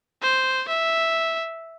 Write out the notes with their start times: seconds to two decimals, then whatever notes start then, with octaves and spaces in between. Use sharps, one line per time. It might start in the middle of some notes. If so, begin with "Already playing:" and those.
0.22 C5
0.68 E5